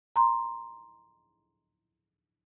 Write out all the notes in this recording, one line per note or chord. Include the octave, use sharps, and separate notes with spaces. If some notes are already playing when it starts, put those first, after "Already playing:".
A#5 C6